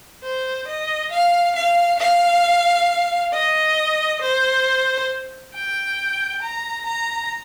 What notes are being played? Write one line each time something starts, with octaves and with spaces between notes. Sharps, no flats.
C5
D#5
F5
F5
F5
D#5
C5
G5
A#5
A#5